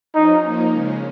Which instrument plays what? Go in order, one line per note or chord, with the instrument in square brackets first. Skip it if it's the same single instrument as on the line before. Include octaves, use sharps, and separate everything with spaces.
[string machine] F3 C#4 [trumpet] D#4
[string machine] F3 A#3 D#4
C#3 G#3 C#4